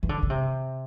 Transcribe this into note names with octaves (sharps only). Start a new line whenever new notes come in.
E3
D3
D3
C3